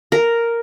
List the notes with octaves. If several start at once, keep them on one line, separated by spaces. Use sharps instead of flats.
A#4